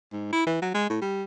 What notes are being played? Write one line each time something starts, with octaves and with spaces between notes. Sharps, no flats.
G#2
E4
E3
F#3
G#3
A2
G3